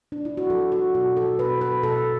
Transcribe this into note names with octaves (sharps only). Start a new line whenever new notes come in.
D4
E4
F#4
F#3 A4
F#4
B2 F#4
A4
B2 B4
B4
B2 A4